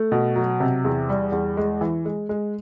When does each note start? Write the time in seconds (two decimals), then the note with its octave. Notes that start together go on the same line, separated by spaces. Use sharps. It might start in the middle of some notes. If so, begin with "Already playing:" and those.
Already playing: A3
0.12 B2
0.36 F#3
0.60 C3
0.85 E2
1.09 G3
1.32 E2
1.57 G#3
1.81 E3
2.05 G#3
2.29 G#3